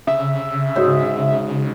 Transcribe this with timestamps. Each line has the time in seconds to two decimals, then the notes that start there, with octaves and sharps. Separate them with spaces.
0.07 C#3 E5 D#6
0.76 G#2 F#4 C#5